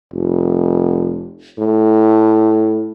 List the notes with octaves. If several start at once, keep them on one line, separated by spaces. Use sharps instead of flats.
F1
A2